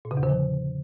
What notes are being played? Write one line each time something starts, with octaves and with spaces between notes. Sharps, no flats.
A#2
C#3
E2
D3
F3